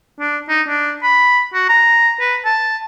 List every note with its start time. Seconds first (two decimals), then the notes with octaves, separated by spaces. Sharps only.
0.20 D4
0.49 D#4
0.68 D4
1.03 B5
1.54 F#4
1.69 A#5
2.21 B4
2.45 A5